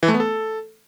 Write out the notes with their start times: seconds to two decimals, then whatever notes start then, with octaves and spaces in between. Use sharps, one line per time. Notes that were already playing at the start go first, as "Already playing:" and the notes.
0.03 E3
0.08 A3
0.14 B3
0.20 A4